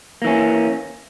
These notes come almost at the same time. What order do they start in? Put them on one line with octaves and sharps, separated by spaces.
A#3 E3 C#4